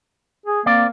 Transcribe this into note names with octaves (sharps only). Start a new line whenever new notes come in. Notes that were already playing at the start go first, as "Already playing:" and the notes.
G#4
A#3 C4 D5